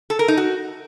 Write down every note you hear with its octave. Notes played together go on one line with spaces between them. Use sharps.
A4
A#4
D#4
F#4